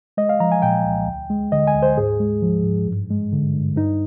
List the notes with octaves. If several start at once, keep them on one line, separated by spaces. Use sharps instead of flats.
G#3 D#5
F5
F3 A#5
G#5
A#2 G5
C2
D2
G#3
D3 D#5
G#5
D2
C5
G#2 G#4
G#3
F3
G#2
G2
G#3
D3
G2
G2 D#4